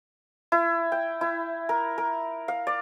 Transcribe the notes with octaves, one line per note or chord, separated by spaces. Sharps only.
E4
G5
E4
A#4
A#4
F5
D5